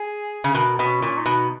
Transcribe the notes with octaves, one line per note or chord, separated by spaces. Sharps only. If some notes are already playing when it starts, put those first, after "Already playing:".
Already playing: G#4
C#3
B2 A#4
B2 B3
C#4
A#2 C#4
D#4
B2